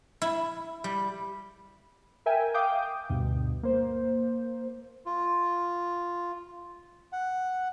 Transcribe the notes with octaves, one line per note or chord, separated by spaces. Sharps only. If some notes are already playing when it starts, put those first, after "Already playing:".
E4
G3
A#4 E5 G5 G#5
F5 G5 D6 D#6 G6
D2 G2 B2
A#3 C5
F4
F#5